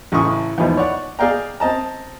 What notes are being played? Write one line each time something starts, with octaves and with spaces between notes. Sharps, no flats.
A1 A2 C#3 G#5 C#6 D#6
E2 G#2 B2 F3
C#5 D5 F#5
G#4 D5 F5 G5 A#5
C4 D#5 A5 A#5